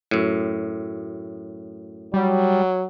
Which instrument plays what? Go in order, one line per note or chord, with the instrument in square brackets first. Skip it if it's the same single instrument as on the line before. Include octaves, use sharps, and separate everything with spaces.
[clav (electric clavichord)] F#2 A2
[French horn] F#3 [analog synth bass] G3